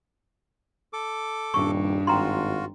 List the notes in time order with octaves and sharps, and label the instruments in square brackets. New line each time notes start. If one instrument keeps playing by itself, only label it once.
[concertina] A4 D6
[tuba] D#1 [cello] G2 [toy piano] C#6
[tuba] G#1 [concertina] F4 F#4 [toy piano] G5 A#5 C6